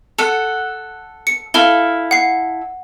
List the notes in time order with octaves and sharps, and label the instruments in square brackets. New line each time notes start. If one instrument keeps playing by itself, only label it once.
[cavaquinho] A4 F#5
[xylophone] C#7
[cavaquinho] E4 A4 F5 [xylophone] F6 G7
[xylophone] F#5 C7